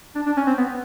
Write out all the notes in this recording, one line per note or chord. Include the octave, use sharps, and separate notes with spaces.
D4
D4
C#4
C4
B3